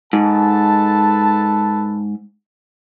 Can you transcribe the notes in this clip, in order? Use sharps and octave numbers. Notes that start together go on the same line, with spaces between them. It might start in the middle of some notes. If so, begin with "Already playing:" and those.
G#2 A4 B4 A5